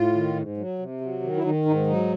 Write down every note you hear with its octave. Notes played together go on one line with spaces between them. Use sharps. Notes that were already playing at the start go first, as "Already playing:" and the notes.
Already playing: A2 F4
D#3
G#2
F#3
C3
F#3
D#3
E4
D#3 D#4
G#2 D#4
F#3 D#4